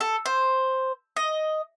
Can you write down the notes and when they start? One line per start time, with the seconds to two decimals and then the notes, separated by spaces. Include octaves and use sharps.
0.01 A4
0.26 C5
1.16 D#5